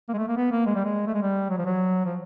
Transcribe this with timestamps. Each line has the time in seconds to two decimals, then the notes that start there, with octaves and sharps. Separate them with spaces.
0.08 A#3
0.14 G#3
0.18 A3
0.28 A#3
0.37 B3
0.52 A#3
0.66 G#3
0.75 G3
0.85 G#3
1.07 A3
1.14 G#3
1.22 G3
1.50 F#3
1.58 F3
1.65 F#3
2.06 F3